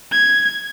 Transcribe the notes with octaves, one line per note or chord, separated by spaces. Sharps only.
G#6